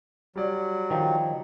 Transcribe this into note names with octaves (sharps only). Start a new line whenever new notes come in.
F#3 G3 D5
D#3 F3 D#4 G5